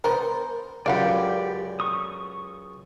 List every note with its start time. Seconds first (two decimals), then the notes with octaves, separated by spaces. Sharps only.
0.04 B3 A#4 C5
0.86 C#2 F#2 G3 G4 D5 F5 F#5
1.80 C#6 D#6